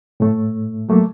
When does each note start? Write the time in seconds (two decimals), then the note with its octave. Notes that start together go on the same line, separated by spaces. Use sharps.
0.20 A2 A3
0.89 F#3 A3 A#3